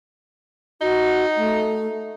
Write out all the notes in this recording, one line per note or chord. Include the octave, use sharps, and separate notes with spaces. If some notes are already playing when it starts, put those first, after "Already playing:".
D#4 F#4
A3